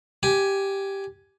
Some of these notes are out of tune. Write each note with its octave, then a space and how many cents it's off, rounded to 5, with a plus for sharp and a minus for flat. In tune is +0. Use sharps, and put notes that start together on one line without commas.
G4 +0 G#5 +10